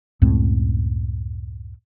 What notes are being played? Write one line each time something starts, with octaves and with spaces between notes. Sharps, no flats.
C#2 F#2 A2 C4